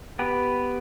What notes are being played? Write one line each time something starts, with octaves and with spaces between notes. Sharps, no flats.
B3 G4 B4